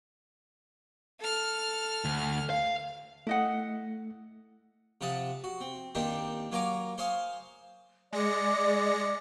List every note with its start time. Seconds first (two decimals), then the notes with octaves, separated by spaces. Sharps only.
1.19 A4 F6
2.05 D2
2.50 F5
3.27 A3 E4 D#5 F#5
5.01 C3 F3 F#5 A5 D#6
5.44 F#4
5.61 C4
5.95 A#2 D#3 C4 D4 D#4 G4
6.52 F#3 A#3 C#5 G#5 A#5 D6
6.98 C5 C#5 F5 G#5 D#6
8.13 G#3 D5 A#6 C#7